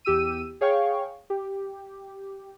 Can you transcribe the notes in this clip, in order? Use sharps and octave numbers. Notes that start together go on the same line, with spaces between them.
E2 G4 E6 D#7
G#4 C#5 F5 G5 C#6
G4